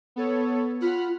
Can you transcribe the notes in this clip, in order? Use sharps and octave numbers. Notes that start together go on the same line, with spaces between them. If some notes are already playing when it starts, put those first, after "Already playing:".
B3 A4 C#5
F4 F#5 B5 F6